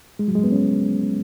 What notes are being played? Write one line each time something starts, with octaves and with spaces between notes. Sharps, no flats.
G#3
F#3
G#3
B3
C#4